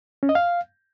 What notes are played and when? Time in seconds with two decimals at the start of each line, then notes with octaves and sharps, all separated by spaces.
0.23 C#4
0.29 D#5
0.35 F5